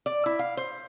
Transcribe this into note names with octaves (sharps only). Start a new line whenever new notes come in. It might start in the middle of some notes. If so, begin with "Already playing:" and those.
D5
E4
F5
C5